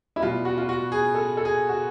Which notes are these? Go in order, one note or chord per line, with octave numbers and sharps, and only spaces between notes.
E4
B2 G3 F4
F#4
F4
F#4
G#4
A4
A4
G#4
F#4